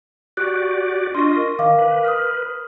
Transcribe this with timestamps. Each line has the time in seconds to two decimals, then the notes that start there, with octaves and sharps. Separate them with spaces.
0.37 F#4 G4 D5 C#6 F#6
1.15 D4 F4 D#5 C6 C#6
1.36 A#4
1.59 D#3 D#5 F5 D6
1.78 B4
2.04 D#6 F6